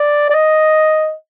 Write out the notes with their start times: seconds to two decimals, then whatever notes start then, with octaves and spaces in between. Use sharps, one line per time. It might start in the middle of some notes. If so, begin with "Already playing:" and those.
Already playing: D5
0.30 D5
0.35 D#5